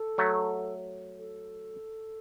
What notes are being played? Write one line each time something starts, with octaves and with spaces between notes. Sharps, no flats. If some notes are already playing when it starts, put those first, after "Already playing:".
Already playing: A4
F#3 A3
A4